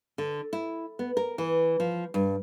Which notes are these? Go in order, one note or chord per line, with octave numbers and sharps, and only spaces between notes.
D3
E4
B3
A#4
E3
F3
G2